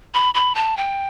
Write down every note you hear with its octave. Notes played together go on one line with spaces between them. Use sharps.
B5
B5
A5
G5